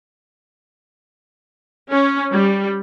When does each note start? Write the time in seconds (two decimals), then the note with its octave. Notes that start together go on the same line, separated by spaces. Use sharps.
1.90 C#4
2.32 G3